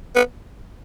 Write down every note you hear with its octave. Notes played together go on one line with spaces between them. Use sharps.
B3